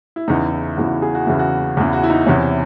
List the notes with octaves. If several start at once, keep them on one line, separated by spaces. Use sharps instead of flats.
E4
E2 C#3 E3 D#4
E4
E2 C#3 E3 F#4
G#4
F#4
E2 C#3 E3 E4
F#4
E2 C#3 E3
F#4
E4
D#4
E2 C3 E3 C#4